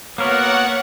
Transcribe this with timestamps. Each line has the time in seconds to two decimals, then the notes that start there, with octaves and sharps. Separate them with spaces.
0.18 A#3 B3 F#4 A#4 C#5 F#5